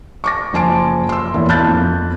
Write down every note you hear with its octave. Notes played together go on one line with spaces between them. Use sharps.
C#6 D6 A#6
F#1 F3 G#5 A5 C6 D7
C6 E6
E1 A1 A#2 E4
A5 B5 F#6 G6 A6
F2